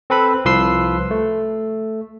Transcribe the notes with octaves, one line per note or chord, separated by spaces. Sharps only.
C4 A4 B4 B5
C2 F3 B4 C6 E6 C7
A3